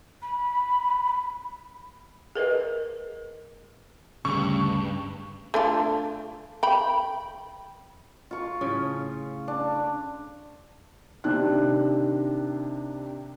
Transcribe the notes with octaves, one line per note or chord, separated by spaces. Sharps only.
B5
G#4 A#4 B4 D#5
D2 G2 C#3 C#6
A3 D4 F4
G5 B5
F4 C#6
A2 C#3 C#4
D4
C3 D#3 D4 F#6